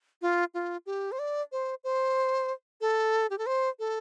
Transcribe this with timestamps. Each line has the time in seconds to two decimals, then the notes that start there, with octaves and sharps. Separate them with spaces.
0.22 F4
0.54 F4
0.86 G4
1.12 C5
1.19 D5
1.52 C5
1.84 C5
2.81 A4
3.30 G4
3.38 A4
3.46 C5
3.79 A4